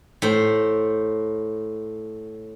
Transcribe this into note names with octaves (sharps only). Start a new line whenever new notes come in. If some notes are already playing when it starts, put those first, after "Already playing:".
A2 C5